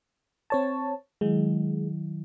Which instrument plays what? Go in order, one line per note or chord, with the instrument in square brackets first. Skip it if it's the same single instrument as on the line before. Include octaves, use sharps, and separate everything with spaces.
[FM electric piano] C4 C#5 A5
[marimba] D#3 F#3 E4 [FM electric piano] G#3